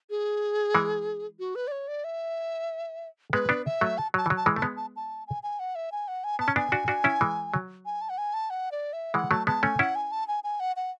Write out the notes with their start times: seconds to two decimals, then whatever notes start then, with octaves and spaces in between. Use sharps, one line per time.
0.10 G#4
0.75 E3 G#3
1.39 F#4
1.55 B4
1.67 D5
1.72 C#5
1.88 D5
2.04 E5
3.33 G#3 B3 B4
3.49 B3 D4
3.66 E5
3.81 F#3 A3
3.98 A5
4.14 F#3 A5
4.26 E3
4.30 F#3
4.37 A5
4.46 E3 G#3
4.56 A3 A5
4.62 G#3 B3
4.76 A5
4.96 A5
5.27 G#5
5.43 G#5
5.59 F#5
5.75 E5
5.92 G#5
6.08 F#5
6.24 G#5
6.39 B3 A5
6.48 C#4
6.56 B3 D4 G#5
6.72 D4 F#4
6.88 D4 F#4
7.04 C#4 E4
7.21 E3 G#3
7.54 F#3
7.86 G#5
8.01 A5
8.09 F#5
8.18 G#5
8.34 A5
8.50 F#5
8.72 D5
8.93 E5
9.14 E3 G#3 F#5
9.31 F#3 A3 A5
9.47 G#3 B3 A5
9.63 A3 C#4 G#5
9.79 C#4 E4 F#5
9.95 G#5
10.12 A5
10.28 G#5
10.44 G#5
10.60 F#5
10.76 F#5